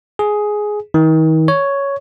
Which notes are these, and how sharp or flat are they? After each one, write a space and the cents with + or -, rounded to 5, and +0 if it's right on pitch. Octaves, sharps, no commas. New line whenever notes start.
G#4 +10
D#3 +40
C#5 +5